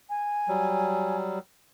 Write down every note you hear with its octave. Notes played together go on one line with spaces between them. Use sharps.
G#5
F#3 G3